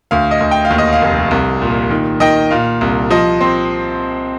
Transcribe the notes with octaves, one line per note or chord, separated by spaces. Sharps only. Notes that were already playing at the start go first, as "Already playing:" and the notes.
D2 F5
D#5
D2
G5
F5
D#2
D#5
F5
F1
C2
A#2
D#3
D#3 D#5 G5
A#2 F5
C2
F3 D#5
C4